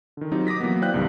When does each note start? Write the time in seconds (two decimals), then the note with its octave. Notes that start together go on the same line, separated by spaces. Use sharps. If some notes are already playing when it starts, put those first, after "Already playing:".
0.17 D3 D#3
0.31 F#3 C4 D#4 F4 G4
0.47 D6 D#6 A#6 B6
0.60 E3 F#3 A#3 B3
0.82 C5 D5 F5 G5 F#6 G6
0.94 C2 G2 D#3 G3 D4